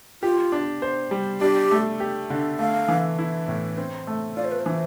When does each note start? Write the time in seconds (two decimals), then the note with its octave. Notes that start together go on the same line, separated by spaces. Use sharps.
0.23 F4 G4
0.52 D4
0.82 C5
1.11 G3
1.41 D4 G4
1.71 A3
2.00 G4
2.30 D3
2.59 A3 F5
2.89 E3
3.19 E4
3.48 A2
3.78 C4
4.07 A3
4.37 F4 D5
4.45 C5
4.52 B4
4.59 C5
4.66 E3